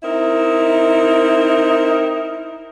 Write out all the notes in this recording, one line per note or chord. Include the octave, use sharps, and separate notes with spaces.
C4 D#4 E4 A#4